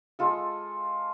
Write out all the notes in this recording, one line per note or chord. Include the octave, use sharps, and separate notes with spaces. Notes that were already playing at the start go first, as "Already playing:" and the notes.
G#3 F4 A4